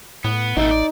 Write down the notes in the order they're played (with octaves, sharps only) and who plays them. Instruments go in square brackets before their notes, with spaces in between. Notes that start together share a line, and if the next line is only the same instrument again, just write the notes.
[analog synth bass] A2 [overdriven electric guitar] B3
[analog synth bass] A1 [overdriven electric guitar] B2 A3 [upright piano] D#4
[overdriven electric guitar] D5